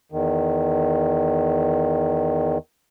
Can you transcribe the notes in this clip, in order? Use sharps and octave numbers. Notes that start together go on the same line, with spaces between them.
E2 D#3